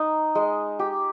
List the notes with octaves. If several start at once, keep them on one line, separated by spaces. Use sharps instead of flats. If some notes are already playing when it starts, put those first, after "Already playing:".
Already playing: D#4
G#3
G4